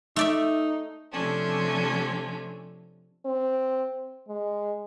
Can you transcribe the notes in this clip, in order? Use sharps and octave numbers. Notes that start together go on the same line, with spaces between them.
A3 D#4 D5 E5
C3 F3 A3 C#4 D4
C4
G#3